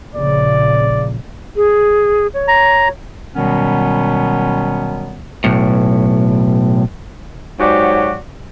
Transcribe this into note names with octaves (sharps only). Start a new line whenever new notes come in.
A#1 C#3 D5
G#4
C#5
A#5
B2 D#3 F#3 G3 B3 C#4
B1 A2
G#2 F#3 F#4 G4 C#5 D5